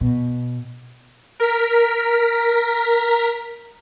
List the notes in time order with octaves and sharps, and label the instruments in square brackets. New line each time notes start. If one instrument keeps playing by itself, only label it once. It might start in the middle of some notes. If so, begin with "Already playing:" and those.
[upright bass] B2
[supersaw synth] A#4 B6